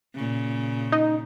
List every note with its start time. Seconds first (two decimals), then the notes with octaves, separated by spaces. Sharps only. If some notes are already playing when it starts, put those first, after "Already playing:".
0.15 A#2 C#3
0.92 D#4